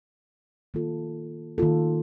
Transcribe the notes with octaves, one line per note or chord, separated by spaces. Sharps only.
D#3 A#3 F4 A4
D#3 A#3 F4 A4